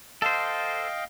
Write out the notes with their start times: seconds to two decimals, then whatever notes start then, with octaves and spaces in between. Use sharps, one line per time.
0.22 A4 C5 D#5 F5 G5